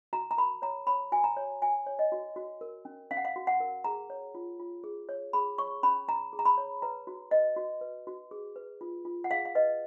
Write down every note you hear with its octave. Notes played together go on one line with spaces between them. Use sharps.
F#4 A#5
A#5
A#4 B5
C#5 A#5
C#5 B5
F#4 G#5
A#5
C#5
F#4 G#5
C#5
D#5
F#4
F#4
A#4
C#4
C#4 F5
F#5
F5
F#4
F#5
A#4
G#4 A#5
C#5
F4
F4
G#4
C#5
G#4 B5
C#5 C#6
C#4 B5
C#4 A#5
G#4
A#5
B5
C#5
B4 A#5
F#4
B4 D#5
F#4
B4
F#4
G#4
B4
F4
F4
F#5
G#4 F5
F5
B4 D#5